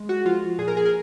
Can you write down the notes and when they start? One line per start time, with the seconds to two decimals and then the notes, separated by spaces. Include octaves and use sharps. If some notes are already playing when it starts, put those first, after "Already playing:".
Already playing: G#3
0.09 F#4
0.25 F3 F4
0.58 A#2 G#4
0.68 A#4
0.77 G#4
0.85 A#4